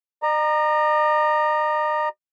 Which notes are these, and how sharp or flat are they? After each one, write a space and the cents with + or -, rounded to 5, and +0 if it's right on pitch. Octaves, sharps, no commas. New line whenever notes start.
D#5 -45 A#5 +0